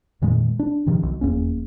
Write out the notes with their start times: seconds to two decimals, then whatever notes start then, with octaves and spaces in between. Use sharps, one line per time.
0.22 F2 A#2 D#3 G#3
0.59 D4
0.86 G2 C3 D#3 F3
1.03 B1
1.21 F1 E2 A#3 C#4